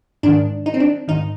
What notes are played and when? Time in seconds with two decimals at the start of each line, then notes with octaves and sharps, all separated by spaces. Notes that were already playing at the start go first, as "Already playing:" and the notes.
0.23 G#2 D#3 D4
0.66 D#4
0.74 C4
0.80 D4
1.08 G#2 D#3 D#4